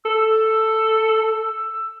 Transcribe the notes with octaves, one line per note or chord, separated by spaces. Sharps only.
A4 E6